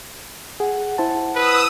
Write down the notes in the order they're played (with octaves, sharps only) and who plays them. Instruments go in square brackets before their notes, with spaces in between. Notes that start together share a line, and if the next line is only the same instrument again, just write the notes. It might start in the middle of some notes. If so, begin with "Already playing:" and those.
[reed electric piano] G#4 [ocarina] F#5
[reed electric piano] E4 C5 A5
[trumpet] B4 [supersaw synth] D#6 E6